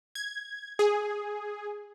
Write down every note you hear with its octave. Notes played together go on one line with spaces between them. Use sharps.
G#6
G#4